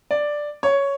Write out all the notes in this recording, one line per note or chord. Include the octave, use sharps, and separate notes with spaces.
D5
C#5